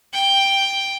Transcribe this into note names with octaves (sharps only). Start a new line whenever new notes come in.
G5